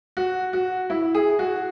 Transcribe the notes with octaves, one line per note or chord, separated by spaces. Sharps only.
F#4
F#4
E4
G#4
F#4